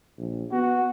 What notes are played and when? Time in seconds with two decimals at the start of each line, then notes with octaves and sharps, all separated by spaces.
0.18 A#1
0.52 B3 F#4